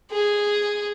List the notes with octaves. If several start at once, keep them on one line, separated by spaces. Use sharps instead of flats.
G#4